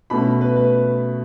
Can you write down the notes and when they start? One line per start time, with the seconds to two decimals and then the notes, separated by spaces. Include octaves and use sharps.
0.10 B2 A3 C#4 B5
0.41 B4
0.56 B4